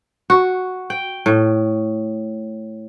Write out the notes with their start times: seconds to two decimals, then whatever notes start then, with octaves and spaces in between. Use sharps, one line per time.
0.30 F#4
0.90 G5
1.26 A2